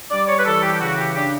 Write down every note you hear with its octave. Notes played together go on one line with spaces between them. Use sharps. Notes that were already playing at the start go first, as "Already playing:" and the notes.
G3 D5
C#5
B4
E3 A4
G4
G4
C#3 F#4
G4
D4 G4